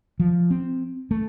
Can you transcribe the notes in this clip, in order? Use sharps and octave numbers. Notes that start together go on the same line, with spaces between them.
F3
C4
A3